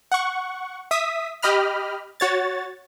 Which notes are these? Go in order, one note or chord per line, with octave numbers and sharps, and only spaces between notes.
F#5 C#6
E5 D#6 B6
G4 D#5 B5 F6
F#4 C#5 A6